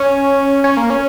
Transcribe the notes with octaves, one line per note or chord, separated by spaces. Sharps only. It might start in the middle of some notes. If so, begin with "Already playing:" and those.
Already playing: C#4
C#4
A#3
C#4